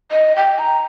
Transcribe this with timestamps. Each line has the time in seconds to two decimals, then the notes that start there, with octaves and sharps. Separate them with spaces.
0.11 D#5
0.36 G5
0.59 A#5